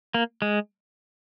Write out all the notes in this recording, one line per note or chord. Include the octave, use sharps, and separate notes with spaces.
A#3
G#3